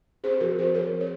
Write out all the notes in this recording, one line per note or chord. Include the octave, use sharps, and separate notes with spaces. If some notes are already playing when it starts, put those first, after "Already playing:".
C4 G#4 C5
F3 F#4 A#4
C4 G#4 C5
F3 A#4 C#5
C4
C#5